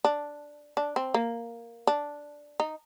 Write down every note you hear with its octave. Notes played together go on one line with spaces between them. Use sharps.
D4
D4
C4
A#3
D4
D#4